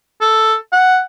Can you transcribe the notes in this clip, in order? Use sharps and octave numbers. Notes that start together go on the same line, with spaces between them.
A4
F#5